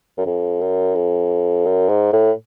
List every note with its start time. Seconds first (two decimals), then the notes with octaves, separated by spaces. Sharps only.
0.18 F#2
0.26 F2
0.61 F#2
0.95 F2
1.66 F#2
1.89 G#2
2.13 A2